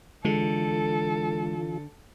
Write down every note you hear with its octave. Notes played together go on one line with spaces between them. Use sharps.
D3 E3 G#3 F4 A4